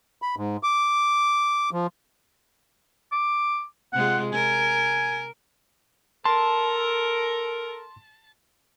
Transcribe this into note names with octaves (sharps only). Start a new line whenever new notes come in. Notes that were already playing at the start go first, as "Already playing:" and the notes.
B5
G#2
D6
F3
D6
C3 G#3 F4 F#5
A#4 G#5
A4 A#4 A5 C6